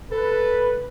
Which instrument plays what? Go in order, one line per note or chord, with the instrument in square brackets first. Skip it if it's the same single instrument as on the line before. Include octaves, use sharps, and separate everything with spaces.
[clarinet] A4 [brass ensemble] B4